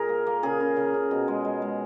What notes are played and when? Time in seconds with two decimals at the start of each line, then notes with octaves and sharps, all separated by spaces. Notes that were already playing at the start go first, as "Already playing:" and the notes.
Already playing: A#2 G#4 A#4
0.09 A#3
0.27 A#3
0.43 C#3 G#4
0.60 C#3
0.76 C#3
0.94 C#3
1.11 B2
1.28 G#3
1.45 G#3
1.62 G#3